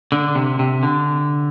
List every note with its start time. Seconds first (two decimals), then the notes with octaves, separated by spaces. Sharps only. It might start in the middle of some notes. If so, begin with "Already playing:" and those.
0.12 D3
0.35 C3
0.59 C3
0.83 D3